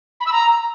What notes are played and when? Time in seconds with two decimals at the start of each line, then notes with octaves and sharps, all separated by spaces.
0.20 B5
0.26 E6
0.32 A#5